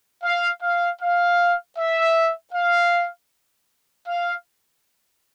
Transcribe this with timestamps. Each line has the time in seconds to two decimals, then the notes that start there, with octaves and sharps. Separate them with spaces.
0.23 F5
0.62 F5
1.01 F5
1.78 E5
2.54 F5
4.07 F5